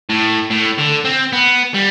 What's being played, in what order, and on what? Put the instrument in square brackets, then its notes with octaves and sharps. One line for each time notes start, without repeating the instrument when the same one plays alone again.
[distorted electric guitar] A2
A2
D3
C4
B3
G3